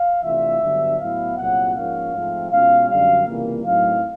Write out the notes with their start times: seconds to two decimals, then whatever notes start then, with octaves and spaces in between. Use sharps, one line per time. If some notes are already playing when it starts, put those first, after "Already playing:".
Already playing: F5
0.23 C3 E3 A3 D4 F4 E5
0.61 G2 D3 F#3 B3 D4
0.99 A2 F#3 B3 E4 F5
1.37 C2 A#2 F#3 F#5
1.75 G#2 F3 A#3 C#4 F5
2.13 G#2 F3 A3 C4
2.51 B2 G#3 C#4 F4 F5
2.89 F#2 D3 G3 F5
3.26 C#2 C3 E3 G3 A#3
3.65 A2 F#3 A3 C4 D#4 F5